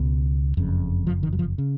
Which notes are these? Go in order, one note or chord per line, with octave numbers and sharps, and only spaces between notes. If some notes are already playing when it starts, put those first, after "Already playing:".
Already playing: C#2 B2
F#1 F2 C#3
F3
D#3
F#3
F3
C#3